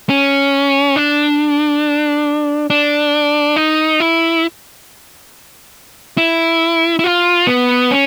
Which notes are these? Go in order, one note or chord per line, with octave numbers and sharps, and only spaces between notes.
C#4
D4
D4
D#4
E4
E4
E4
F4
B3
C#4